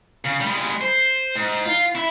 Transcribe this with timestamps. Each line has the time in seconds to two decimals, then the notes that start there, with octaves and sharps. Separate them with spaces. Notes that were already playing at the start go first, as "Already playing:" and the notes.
0.25 C#3
0.40 G3 G#3
0.81 C5
1.35 G#2
1.65 F4
1.95 E4